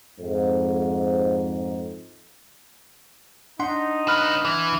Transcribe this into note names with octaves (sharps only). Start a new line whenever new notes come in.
F2 G#2
D4 D#4 F#5 C6
C#3 B4 B5 F6 F#6
E3